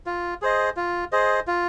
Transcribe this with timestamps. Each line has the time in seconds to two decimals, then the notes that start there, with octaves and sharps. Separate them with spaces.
0.06 F4
0.42 G#4 C5 D#5
0.77 F4
1.12 G#4 C5 D#5
1.47 F4